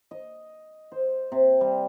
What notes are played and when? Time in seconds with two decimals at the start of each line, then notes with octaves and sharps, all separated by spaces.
0.11 D#5
0.92 C5
1.32 C3
1.61 G3